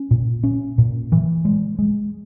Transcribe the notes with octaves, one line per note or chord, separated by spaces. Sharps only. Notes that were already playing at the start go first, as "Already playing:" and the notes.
Already playing: C#4
A#2
C#4
A#2
E3
G#3
G#3